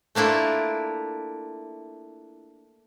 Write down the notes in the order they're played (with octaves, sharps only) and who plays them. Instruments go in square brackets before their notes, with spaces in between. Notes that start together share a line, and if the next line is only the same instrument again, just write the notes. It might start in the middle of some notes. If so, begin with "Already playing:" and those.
[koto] A3 A#3 D4 E4 F4